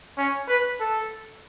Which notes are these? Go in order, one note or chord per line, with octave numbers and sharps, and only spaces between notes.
C#4
B4
A4